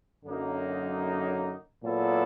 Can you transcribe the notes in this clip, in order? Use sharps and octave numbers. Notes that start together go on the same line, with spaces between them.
F#2 D3 F#3 A#3 D#4
A#2 F#3 B3 E4 A4